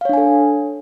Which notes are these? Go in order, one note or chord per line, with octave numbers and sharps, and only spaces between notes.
D4 A4 C#5 F5 G#5